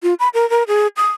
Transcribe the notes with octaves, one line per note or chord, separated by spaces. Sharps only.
F4
B5
A#4
A#4
G#4
D#6